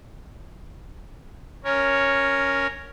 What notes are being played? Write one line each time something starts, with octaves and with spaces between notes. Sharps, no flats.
C#4 A#4 C#5